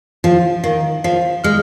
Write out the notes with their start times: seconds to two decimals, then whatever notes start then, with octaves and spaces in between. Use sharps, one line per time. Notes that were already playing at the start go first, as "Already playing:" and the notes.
0.24 F3 F5
0.64 D#3 F5
1.04 F3 F5
1.44 G#3 F6